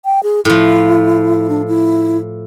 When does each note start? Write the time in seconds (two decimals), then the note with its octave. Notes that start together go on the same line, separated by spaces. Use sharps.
0.05 G5
0.23 G#4
0.45 A2 F3 E4
1.49 D4
1.68 E4